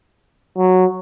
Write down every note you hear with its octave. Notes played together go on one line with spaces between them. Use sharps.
F#3